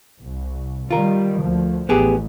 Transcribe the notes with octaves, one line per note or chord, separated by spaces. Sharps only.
C2
D#3 G3 F4 A#4
D2 F3
A1 B3 G4 G#4